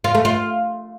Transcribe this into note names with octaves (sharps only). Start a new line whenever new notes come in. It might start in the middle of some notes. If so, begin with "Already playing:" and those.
F4
A3
F4